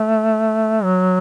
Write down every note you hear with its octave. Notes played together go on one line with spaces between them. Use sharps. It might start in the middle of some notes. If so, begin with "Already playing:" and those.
Already playing: A3
F#3